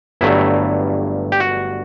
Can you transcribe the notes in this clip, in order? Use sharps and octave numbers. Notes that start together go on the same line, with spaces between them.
G1 G2 F#3 A3 E4
G4
F#4